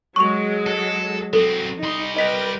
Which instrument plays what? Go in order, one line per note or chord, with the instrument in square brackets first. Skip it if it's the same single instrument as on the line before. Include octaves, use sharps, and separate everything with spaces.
[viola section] F#3 G#3 [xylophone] C#6 F7
[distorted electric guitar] A4
[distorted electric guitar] F#3 C4 [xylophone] A4
[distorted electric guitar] G3 C6 [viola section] D#4
[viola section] A#4 B4 G5 [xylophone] D#5 B6 F7